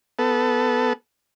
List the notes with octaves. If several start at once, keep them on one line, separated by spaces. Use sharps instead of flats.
B3 A4